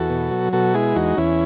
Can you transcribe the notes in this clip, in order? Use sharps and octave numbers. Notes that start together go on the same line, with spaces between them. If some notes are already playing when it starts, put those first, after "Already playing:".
Already playing: E2 F#4 A4
B2
F#3
B2 F#4 A4
G#3 E4 G#4
E2 D#4 F#4
E2 C#4 E4